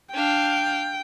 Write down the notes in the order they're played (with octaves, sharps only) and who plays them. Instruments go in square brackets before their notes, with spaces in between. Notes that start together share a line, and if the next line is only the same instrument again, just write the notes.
[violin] D4 F5 [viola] G5